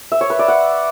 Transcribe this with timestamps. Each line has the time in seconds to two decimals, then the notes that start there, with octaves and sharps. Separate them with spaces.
0.12 E5
0.21 C#5
0.30 B4
0.39 D5
0.48 F#5